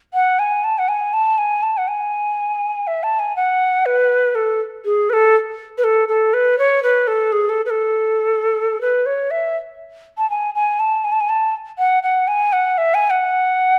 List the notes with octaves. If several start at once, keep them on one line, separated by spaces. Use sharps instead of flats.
F#5
G#5
A5
F#5
G#5
A5
G#5
A5
F#5
G#5
E5
A5
G#5
F#5
B4
A4
G#4
B4
A4
B4
A4
A4
B4
C#5
B4
A4
G#4
A4
B4
A4
B4
C#5
E5
A5
G#5
G#5
A5
G#5
A5
G#5
A5
F#5
F#5
G#5
F#5
E5
G#5
F#5